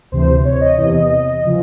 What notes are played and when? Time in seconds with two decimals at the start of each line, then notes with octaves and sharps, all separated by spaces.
0.12 D2 C3 E3 C5
0.45 C#5
0.61 D#5
0.77 E2 C3 E3 D#5
1.45 C#3 F3